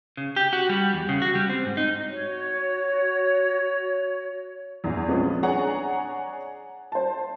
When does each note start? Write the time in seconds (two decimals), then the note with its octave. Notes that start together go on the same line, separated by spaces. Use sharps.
0.17 C#3
0.36 G4
0.53 F#4
0.69 G3
0.94 E2
1.09 C#3
1.22 F#4
1.35 G3
1.49 C4
1.65 G#2
1.77 D#4
2.09 F#4 C#5
4.84 A#1 E2
5.08 C3 F3 G#3 B3 C#4
5.43 D4 G#4 C#5 F#5 G#5 A#5
6.92 C5 A5